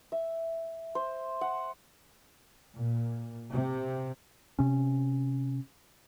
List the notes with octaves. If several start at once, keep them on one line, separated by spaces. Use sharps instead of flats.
E5
C5
F#5
A#2
C3
C3 C#4